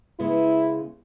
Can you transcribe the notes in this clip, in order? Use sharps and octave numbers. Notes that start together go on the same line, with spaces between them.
C#3 G#3 B3 E4